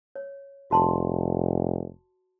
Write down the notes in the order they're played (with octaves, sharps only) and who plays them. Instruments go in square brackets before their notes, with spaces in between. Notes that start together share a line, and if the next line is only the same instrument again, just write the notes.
[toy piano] C#5
[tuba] F1 [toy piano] F#4 A5 C6